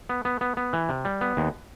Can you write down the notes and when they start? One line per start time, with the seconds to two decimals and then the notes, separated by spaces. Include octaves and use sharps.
0.09 B3
0.25 B3
0.41 B3
0.57 B3
0.73 E3
0.89 C3
1.05 G3
1.21 B3
1.37 D#2